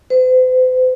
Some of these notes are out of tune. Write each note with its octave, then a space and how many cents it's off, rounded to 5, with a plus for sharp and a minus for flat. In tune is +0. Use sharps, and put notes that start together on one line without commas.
C5 -45